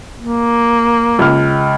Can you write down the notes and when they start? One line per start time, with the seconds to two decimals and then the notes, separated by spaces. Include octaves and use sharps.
0.19 A#3
1.19 C#2 F6